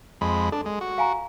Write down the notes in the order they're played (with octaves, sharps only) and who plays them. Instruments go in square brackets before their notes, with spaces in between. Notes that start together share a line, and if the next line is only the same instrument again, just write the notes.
[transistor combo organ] F2 G#3 B5
[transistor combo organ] D4 [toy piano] A4
[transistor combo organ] G#3
F#4
[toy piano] F5 G#5 A#5